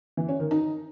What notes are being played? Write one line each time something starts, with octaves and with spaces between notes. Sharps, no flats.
E3
C#4
D#3
D#4